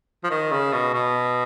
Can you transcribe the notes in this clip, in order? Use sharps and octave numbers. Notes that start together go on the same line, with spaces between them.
F3
D#3
C#3
B2
B2